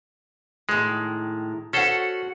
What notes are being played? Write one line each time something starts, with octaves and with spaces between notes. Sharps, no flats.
A2 D#3 G#3
C#4 F#4 A4 C5 F#5